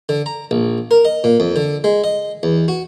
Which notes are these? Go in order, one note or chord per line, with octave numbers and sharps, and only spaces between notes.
D3
A#5
A#1
A#4
D#5
A#2
F2
D3
G#3
D#5
E2
F#4